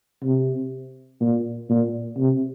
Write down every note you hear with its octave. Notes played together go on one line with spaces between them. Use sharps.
C3
A#2
A#2
C3